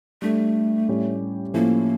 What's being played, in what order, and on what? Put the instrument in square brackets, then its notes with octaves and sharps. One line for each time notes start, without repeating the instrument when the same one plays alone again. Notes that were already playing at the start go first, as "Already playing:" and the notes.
[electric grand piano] G3 D4 A4 [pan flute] A3
[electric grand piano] A2 G3 C#4 G4 C#5
[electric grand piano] A2 F3 A3 C#4 E4 [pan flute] A#3